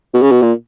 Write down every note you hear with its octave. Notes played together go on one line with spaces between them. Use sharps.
B2
C#3
B2
A#2